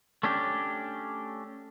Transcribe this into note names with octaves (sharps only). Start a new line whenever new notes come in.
A3 C#4 D4 G4